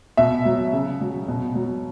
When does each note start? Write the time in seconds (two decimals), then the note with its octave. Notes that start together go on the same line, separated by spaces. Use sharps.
0.17 B2 E5
0.45 F#3
0.72 C#3
1.01 F#3
1.28 B2
1.55 F#3